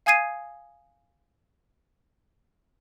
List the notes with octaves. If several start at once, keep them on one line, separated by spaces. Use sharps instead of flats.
F5 G#5 D#6 G#6 C7 D#7